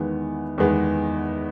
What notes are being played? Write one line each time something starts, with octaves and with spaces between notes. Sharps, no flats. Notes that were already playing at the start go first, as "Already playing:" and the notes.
Already playing: E2 D#3 G#3 B3
E2 D#3 G#3 B3